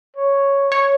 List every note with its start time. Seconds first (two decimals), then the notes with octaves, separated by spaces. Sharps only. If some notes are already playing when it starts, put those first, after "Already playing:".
0.16 C#5
0.72 C#5